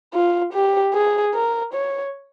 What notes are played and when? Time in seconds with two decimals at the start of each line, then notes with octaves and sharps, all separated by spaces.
0.14 F4
0.53 G4
0.94 G#4
1.34 A#4
1.74 C#5